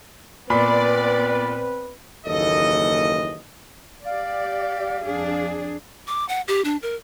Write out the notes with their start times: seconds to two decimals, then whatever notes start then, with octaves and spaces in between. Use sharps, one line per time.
0.50 A#2 B3 C4 B4 D5 B5
2.27 F#1 D#2 E3 A4 D#5
4.05 G4 D5 F5
5.04 F2 D4 G#4
6.08 D6
6.29 F#5
6.48 G4
6.65 D4
6.82 A#4